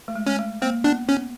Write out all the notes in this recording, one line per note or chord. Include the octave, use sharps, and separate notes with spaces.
A3
G#3
G#3 C#4
A3
A#3 C4
B3 D4
B3 C#4